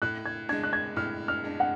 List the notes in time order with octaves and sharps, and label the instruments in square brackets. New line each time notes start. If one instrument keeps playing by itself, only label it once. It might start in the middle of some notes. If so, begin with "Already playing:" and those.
[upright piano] A2 [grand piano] F#6
[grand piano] G#6
[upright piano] G#3 D4 [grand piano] G#6
[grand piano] F#6
G#6
[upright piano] A2 [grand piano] F6
[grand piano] F6
[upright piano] G#3 D4
[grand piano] F#5